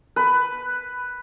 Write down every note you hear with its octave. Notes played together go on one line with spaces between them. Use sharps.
B4